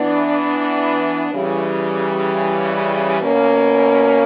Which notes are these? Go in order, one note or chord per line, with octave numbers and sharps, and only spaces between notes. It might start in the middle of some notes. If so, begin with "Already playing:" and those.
Already playing: E3 B3 D4
C#3 E3 G3
B2 A#3 C#4